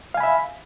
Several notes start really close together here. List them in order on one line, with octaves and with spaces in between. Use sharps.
F5 G#5 B5 E5